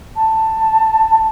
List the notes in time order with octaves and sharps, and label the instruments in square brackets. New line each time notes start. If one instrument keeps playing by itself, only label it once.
[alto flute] A5